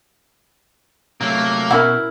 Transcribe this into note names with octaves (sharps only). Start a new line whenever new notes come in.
C3 F#3 A3 A#3
B2 C#4 E4 A#4 F#5